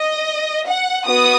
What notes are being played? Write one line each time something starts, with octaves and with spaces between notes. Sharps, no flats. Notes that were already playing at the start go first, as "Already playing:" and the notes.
Already playing: D#5
F#5
B3 F#4 D#6